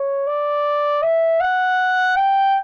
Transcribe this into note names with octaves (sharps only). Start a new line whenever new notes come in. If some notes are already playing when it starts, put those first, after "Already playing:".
Already playing: C#5
D5
E5
F#5
G5